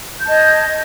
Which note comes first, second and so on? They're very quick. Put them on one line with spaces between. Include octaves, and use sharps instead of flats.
G6 A5 D#5 G#6